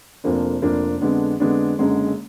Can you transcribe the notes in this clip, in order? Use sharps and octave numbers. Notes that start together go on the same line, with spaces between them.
F1 F2 F3 A#3 D4
F1 F2 F3 A#3 D4
F2 D3 G#3 B3 D4
F2 D3 G#3 B3 D4
F#1 F#2 D3 G#3